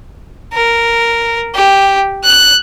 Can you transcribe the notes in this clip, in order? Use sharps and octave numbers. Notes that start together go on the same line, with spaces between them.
A#4
G4
F#6